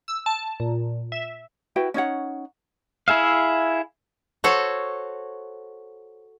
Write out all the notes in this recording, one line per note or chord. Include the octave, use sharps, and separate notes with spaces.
E6
A5
A#2
E5
E4 F#4 B4 G5
C#4 D#4 C#5 F#5
E4 G#4 E5 F5
F#4 A4 C5 C#5